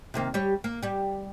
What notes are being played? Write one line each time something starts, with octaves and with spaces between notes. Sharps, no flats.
C3 D#3 A#3
G3 G4 C#5
A#3
G3 G4